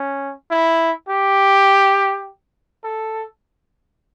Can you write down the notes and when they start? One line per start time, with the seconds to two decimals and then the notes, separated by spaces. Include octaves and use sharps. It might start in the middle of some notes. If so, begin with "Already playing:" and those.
Already playing: C#4
0.51 E4
1.09 G4
2.84 A4